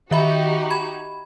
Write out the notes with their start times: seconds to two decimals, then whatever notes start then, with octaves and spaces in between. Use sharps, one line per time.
0.11 D#3 D#4 F#4 G4 E5 B5
0.70 B5 G#6